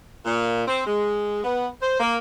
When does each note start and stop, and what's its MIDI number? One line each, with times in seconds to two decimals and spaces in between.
0.25 0.62 46
0.66 0.82 60
0.86 1.41 56
1.43 1.67 59
1.81 1.99 72
2.00 2.16 58